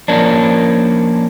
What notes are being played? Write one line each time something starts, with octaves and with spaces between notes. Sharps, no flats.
F3 A#3 C#4 D4